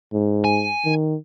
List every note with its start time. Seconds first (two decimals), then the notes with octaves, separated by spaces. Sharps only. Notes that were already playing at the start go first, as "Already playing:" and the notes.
0.14 G#2
0.44 G#5
0.85 D#3